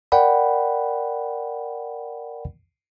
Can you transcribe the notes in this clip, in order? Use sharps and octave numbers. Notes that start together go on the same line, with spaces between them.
A#4 D5 F#5 G5 B5